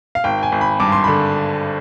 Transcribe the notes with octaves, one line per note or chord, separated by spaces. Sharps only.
F5
G#1 G5
G#5
G#1
B5
G2 D6
C6
D3 B5